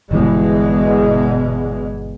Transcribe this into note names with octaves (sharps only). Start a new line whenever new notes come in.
G1 E2 B2 E3 G3 G#3